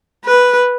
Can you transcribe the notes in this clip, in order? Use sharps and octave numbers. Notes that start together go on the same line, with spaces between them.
B4